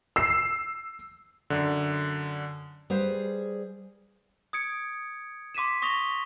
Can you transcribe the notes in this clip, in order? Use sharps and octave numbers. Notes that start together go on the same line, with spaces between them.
E6 C7
F#2 D3
G3 G#4 B4 C5 F5
D#6 G#6 C#7 D7
C6 D6 B6 D#7 E7
C#6 D#6 A#6 F7 G7